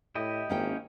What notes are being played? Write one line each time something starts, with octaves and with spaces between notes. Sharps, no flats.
A2 E4 G4 D#5
G#1 A#3 C#4 G5